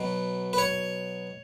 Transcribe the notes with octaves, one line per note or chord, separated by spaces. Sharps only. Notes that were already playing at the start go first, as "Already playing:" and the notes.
Already playing: B2 F#3 B4
B4
C#5